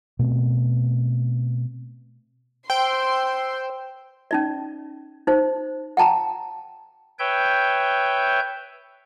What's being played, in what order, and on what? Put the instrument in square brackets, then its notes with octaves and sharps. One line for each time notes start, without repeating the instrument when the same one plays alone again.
[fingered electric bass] B2 A3 C4
[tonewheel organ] C5 E6 [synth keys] G5 [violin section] C6
[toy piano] C#4 D#4 D5
D#4 C5
F#5 G5 A5 A#5
[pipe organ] B4 C#5 E5 G5 G6